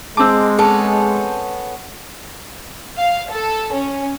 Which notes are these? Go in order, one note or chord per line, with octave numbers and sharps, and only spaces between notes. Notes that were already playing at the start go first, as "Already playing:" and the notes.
G#3 C4 A5 D6 E6
B3 C#4 G#4 A4 A5
F5
A4
C#4